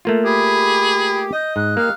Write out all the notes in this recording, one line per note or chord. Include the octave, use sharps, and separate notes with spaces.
A3 A#3 F4 A4
G4 G#4 B5
D#5 G6
G#2 F#6
A#3 D#4 G4 F5